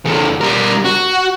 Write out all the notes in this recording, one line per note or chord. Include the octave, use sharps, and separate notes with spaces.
E2 A3
G3 A#4
F#4